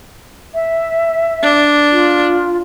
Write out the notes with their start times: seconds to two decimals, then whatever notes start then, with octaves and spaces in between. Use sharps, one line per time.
0.55 E5
1.42 D4
1.92 F4